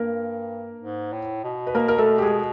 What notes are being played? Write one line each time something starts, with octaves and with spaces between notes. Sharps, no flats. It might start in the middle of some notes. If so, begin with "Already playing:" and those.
Already playing: G2 A#3 A#4
G#2
A2
B2
B4
A#3 A#4
A#4
A3 A4
G4
G#3 G#4